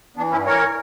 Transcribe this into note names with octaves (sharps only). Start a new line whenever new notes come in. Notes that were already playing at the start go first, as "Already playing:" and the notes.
E3 B3 D4
G2 C#4 E4
E3 A#4 C#5